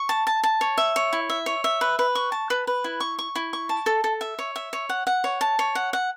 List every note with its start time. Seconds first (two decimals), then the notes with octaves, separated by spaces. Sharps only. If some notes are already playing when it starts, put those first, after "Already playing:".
Already playing: C#6
0.09 A5
0.27 A5
0.44 A5
0.61 C#5
0.78 E5
0.96 C#5
1.13 E4
1.30 E5
1.46 C#5
1.64 E5
1.81 B4
1.99 B4
2.15 C#6
2.32 A5
2.50 B4
2.67 B4
2.84 E4
3.00 C#6
3.19 C#6
3.35 E4
3.53 C#6
3.69 A5
3.86 A4
4.04 A4
4.21 E5
4.39 C#5
4.56 E5
4.73 C#5
4.89 F#5
5.07 F#5
5.24 C#5
5.41 A5
5.59 C#5
5.75 F#5
5.93 F#5